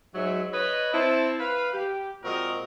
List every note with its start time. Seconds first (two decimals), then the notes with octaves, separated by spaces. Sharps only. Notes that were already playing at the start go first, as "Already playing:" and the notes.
0.14 G#2 F#3 E5
0.53 B4 C#5 D#5
0.92 C4 E4 A5
1.39 B4 F5
1.73 G4
2.23 A#2 G#3 C4 F#4 A#4 D#5